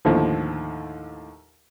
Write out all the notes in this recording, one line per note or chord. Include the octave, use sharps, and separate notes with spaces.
D#2 A2 D3 F3